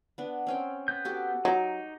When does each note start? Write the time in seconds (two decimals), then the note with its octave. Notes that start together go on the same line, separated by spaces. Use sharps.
0.18 B3 D4
0.47 C4 C#4 G5
0.88 B3 G6
1.05 F#4 G4 A4
1.45 F#3 D#4 C#6 D6